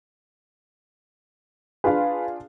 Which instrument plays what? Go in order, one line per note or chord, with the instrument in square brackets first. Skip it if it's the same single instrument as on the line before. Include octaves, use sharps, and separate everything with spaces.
[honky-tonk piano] D4 F4 G#4 [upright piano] B4 F5